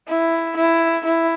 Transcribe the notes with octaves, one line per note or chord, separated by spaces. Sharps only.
E4
E4
E4